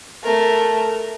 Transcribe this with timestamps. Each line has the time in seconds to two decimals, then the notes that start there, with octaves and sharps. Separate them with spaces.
0.23 A3 A#4